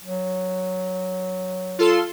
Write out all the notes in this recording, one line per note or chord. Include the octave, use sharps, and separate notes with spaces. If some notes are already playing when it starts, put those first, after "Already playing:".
F#3
F4 A4 C6